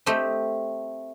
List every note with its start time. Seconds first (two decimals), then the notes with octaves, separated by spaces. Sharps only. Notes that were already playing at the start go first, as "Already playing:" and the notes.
0.06 A3 C4 G4 D#5